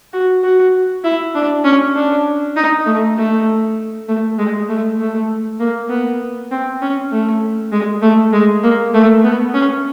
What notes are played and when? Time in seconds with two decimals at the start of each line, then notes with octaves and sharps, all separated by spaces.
0.13 F#4
0.44 F#4
1.04 E4
1.35 D4
1.64 C#4
1.95 D4
2.56 D#4
2.86 A3
3.17 A3
4.08 A3
4.38 G#3
4.69 A3
4.99 A3
5.60 A#3
5.90 B3
6.51 C4
6.82 C#4
7.11 A3
7.72 G#3
8.02 A3
8.33 G#3
8.64 A#3
8.94 A3
9.24 B3
9.54 C#4